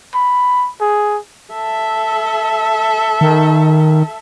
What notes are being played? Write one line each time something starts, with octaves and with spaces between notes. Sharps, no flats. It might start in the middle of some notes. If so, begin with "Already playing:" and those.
B5
G#4
A4 E5
D#3